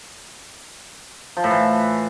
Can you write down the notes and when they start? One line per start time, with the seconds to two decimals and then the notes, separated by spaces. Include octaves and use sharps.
1.37 F3
1.44 A2
1.51 E3